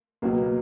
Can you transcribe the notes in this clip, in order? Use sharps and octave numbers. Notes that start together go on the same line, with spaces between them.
C#2 B2 F#3 A#3
B3
A#3